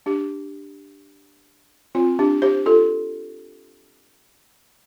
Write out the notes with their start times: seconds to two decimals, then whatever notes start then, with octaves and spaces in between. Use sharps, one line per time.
0.06 D4 G4
1.95 C4 F4
2.19 D4 G4
2.42 G4 C5
2.66 F4 A4